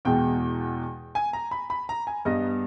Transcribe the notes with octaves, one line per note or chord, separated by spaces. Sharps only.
E2 B2 G#3 G5
G#5
A#5
B5
B5
A#5
G#5
G2 G3 B3 D#5